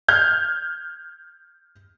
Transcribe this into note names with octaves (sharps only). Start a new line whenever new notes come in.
F6 G6 G#6